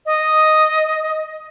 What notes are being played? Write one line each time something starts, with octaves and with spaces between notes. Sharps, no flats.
D#5